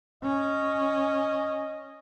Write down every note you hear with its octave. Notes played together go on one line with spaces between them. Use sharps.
C#4 D#5